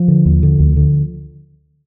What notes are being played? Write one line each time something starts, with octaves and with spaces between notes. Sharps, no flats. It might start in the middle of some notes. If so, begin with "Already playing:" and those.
Already playing: F3
D3
D#2
D3
D2
D3